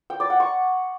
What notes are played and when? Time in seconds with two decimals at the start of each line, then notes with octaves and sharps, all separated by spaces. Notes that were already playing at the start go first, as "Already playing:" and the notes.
0.10 G5
0.20 D5
0.30 F#5
0.40 C#6